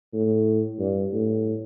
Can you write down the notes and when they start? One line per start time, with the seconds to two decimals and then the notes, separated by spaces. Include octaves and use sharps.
0.13 A2
0.79 G2
1.13 A2